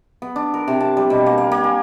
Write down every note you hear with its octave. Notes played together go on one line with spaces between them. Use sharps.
B3
D4
A#4
C3
A5
G3
B2
A#3
A#3
A#3
G#5